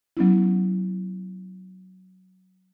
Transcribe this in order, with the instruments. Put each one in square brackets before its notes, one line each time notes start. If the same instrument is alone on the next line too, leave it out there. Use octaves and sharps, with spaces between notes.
[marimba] F#3 B3 C#4 E4